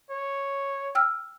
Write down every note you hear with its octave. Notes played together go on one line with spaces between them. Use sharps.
C#5
G5 E6 F6